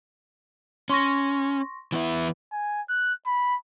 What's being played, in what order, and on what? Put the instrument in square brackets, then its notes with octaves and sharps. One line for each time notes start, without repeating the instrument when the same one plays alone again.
[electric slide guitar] C#4 [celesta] C6 C#6 A#6
[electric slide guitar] E3 B3 E4
[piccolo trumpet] G#5
F#6
B5